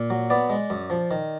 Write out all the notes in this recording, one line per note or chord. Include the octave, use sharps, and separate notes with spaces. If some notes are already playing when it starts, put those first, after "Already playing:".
Already playing: A#2
F#3
B3 D5
G#3
F#2
F3
D#3